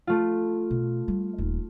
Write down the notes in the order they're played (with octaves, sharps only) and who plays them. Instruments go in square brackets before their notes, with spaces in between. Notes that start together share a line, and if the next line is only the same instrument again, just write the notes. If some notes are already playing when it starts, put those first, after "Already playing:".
[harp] A3 F4
[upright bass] B2
G3
D#1 D#4